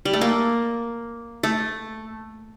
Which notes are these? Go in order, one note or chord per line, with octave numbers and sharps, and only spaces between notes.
G3
A3
A#3
A3